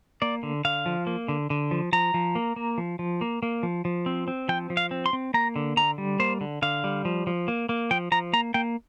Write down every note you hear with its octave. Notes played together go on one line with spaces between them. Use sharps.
A#3 D5
D3
D3 F5
F3
A#3
D3
D3
F3
F3 A#5
F3
A#3
A#3
F3
F3
A#3
A#3
F3
F3
C4
C4
F3 G5
F3
F5
C4
C6
C4
A#3 A#5
D3
D3 A#5
G3
A#3 C5
D3
D3 F5
G3
F3
F3
A#3
A#3
F3 G5
F3 A#5
A#3 A#5
A#3 G5